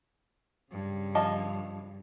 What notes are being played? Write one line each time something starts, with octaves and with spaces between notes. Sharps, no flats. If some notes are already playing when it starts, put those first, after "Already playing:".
G2 C#3
F3 D#5 A5